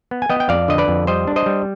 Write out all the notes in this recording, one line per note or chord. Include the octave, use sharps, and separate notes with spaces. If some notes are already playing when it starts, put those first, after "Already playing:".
B3
G#5
B3 D#5 G5
G5
F2 D5 F5
D3 D#5
B4 D5
F2
G3 C5 D#5
D4
C5 D#5
G3